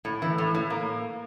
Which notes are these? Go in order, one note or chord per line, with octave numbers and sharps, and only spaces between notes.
A2
E3
A2
A2
A#3